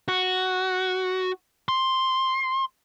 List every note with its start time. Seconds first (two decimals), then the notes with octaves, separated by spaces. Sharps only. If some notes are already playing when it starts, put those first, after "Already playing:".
0.08 F#4
1.69 C6